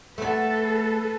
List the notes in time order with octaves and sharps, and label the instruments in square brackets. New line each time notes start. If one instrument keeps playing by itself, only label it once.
[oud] A3 B3 [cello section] A4 B4